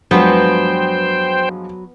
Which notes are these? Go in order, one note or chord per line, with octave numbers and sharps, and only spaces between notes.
G2 F3 F#3 G#3 B3 B4 C5 G5